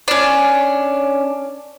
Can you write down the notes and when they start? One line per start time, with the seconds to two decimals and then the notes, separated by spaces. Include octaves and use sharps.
0.08 C#4 D4